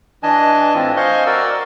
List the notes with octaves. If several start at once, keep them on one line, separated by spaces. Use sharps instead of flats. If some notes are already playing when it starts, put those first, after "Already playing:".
E3 D4 D#5 G#5 A5
A2 E3 C4 F4
C5 D#5 F5 G#5 C6 C#6
F#4 A#4 D5 E6